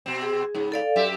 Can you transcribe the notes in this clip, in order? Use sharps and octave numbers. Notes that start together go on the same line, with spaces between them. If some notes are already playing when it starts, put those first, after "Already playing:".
B2 C4
G#4
G#2 C#3
A4 D5 F5
F#2 G4 E5